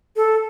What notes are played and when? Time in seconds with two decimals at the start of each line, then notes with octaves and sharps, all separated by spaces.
0.16 A4